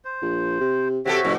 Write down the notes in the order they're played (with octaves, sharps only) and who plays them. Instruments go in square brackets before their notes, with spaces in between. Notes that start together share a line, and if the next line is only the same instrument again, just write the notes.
[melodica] C5
[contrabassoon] A#1
C3
[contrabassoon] C3 [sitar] C4 G4 A4 [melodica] F#4 C#5 E5
[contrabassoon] F#1 [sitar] A#2